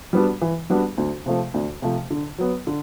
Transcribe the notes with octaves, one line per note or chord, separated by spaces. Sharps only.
G3 B3 D4 F#4
E3
G3 B3 D4 F#4
D2
C3 F3 A3
D2
C3 F3 A3
D3
F#3 B3
D3